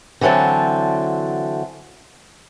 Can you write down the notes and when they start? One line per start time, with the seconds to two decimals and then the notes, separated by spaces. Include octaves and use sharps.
0.21 D3 E3 F#3 C4 A5